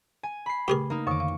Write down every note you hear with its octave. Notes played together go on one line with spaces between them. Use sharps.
G#5
B5 C7
C#3 A3 G4 G#4 A#4
A#3 D#4
F2 D3 D#3 C#6 D6
F5